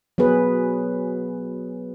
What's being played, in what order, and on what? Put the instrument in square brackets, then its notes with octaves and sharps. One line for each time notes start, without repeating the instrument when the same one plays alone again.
[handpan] F#3 B3 G#4 B4